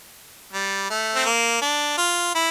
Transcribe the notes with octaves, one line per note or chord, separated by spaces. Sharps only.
G3
A3
C4
A#3
D4
F4
E4